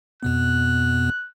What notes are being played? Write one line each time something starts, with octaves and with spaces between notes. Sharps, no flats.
F2 B2 B3 F#6